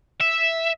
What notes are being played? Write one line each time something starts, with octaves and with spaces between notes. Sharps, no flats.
E5